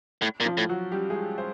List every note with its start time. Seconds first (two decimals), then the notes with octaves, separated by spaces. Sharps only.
0.22 A2
0.40 A#2
0.45 F3 F4
0.57 A2
0.69 F#3 F#4
0.92 G3 G4
1.09 G#3 G#4
1.38 C5